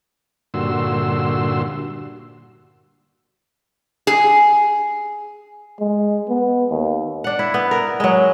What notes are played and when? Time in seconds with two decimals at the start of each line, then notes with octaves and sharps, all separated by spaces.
0.54 G2 A#2 D3 F#4 C6 E6
4.07 G#4
5.80 G#3
6.29 B3
6.71 D#2
7.24 D4 F#5
7.39 E4
7.54 B3
7.71 A#4
8.00 F#3 G#3